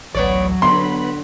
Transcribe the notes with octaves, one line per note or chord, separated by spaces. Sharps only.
A1 D2 F#3 B3 C#5 D5
D3 B3 B5 C6